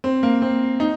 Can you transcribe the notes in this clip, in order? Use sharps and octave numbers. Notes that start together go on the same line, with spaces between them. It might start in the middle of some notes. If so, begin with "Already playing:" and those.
C4
A#3
C4
D#4